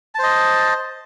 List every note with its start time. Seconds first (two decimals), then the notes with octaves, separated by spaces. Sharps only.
0.15 A5
0.19 C5
0.23 D#5